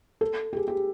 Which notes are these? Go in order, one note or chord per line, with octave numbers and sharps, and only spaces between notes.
A4
G4
G#4
G4